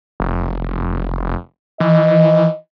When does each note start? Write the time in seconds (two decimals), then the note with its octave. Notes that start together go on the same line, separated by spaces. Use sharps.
0.20 F1
1.80 E3 D#5